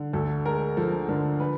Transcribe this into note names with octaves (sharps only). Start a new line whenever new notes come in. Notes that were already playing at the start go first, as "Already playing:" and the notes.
Already playing: D3
D2 A4
G#3 A#4
F3 A4
D3 A#4
B4